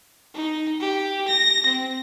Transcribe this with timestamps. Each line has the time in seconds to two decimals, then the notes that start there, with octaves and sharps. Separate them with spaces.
0.34 D#4
0.80 G4
1.28 A#6
1.66 C4